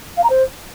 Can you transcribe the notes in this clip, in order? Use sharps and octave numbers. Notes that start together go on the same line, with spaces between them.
F5
A#5
C5